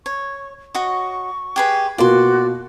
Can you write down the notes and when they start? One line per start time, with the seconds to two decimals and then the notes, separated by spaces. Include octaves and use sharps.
0.06 C#5 C#6
0.75 F#4 C#5 D#5 C#6
1.56 G4 G#4 B4
1.98 B2 A#3 F4 F#4 D5 C6